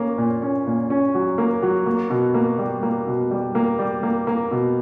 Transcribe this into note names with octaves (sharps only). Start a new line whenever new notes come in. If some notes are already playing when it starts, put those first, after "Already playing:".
Already playing: A#3 C#4
A#2
C#4
A#2
C#4
F#3
A#3
F#3
A#3
B2
A#3
G3
A#3
B2
G3
A#3
G3
A#3
A#3
B2